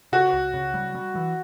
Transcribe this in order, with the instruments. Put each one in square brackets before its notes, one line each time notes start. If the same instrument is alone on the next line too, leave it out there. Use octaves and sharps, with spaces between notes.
[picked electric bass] C#3 [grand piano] F#4
[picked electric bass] C#2
C#3
G3
G3
E3